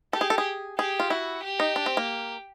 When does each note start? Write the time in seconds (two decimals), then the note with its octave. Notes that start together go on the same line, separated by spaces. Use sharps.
0.13 G4 A4
0.21 G#4
0.30 A4
0.38 G#4
0.79 G4 G#4
1.00 F4
1.10 E4 F#4
1.43 G4
1.60 D#4
1.76 D4
1.86 C4
1.97 A#3